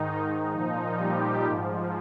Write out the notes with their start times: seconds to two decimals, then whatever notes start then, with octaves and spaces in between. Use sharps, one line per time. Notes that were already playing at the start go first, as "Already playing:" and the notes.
Already playing: G#2 D#3 D#4
0.51 A#2 F3 D#4
0.98 G3 G4
1.46 G#2 F3